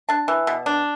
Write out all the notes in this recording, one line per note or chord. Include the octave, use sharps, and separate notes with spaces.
D4 A5
E3
B2
D4